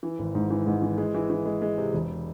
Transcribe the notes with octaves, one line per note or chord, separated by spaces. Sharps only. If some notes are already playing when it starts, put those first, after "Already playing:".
E3
G#1
G#2
E3
G#2
E3
G#3
E3
E3
G#3
G#3
C3
E1